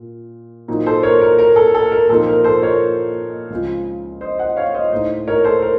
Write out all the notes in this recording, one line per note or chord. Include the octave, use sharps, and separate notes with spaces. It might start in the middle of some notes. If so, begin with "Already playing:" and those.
Already playing: A#2 F4
A#2 F#3 C4 D#4
A4 C5
A#4 C#5
A#4
A#4
A4
A4
A#4
A#2 F3 C4 D#4 A4
A#4
A4 C5
A#4 C#5
C#2 C#3 F3 C4 F4
C5 D#5
D#5 F#5
C#5 F5
C5 D#5
A2 A3 D#4 C5 D#5
A#4 C#5
A4 C5
A#4